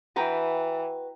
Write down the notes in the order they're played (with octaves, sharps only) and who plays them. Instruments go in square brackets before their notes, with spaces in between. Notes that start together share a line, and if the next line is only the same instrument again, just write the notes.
[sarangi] E3 [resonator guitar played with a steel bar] F#4 B4 [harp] G5 A#5